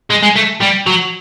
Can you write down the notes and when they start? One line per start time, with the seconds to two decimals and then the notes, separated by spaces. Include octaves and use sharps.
0.10 G#3
0.22 G#3
0.36 A3
0.60 G3
0.86 F#3